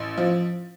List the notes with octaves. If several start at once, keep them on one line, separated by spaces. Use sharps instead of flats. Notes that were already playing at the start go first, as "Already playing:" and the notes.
Already playing: A1
F3